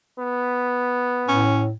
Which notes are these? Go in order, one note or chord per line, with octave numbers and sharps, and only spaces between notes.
B3
A2 C#4